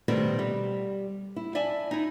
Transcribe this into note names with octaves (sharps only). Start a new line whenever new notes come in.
B2 D#3 G3 A3 B3 C4
G3
E4
D5 E5 G#5 A5
D#4 E4